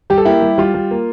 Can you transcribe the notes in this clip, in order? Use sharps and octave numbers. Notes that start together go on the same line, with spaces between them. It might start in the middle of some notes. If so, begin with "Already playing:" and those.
G3 G4
A4
A#3 E4 G4
G3
G3 F4
G3
A#3